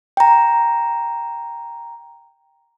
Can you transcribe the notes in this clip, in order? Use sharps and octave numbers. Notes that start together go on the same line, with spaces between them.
G5 A#5